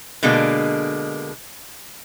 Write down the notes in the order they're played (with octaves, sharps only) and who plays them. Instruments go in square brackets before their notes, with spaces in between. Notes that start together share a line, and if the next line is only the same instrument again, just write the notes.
[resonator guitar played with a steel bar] B2 D3 G#3 A#3